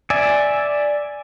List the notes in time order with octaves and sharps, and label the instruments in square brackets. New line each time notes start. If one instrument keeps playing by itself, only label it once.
[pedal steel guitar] D5 E5 G#5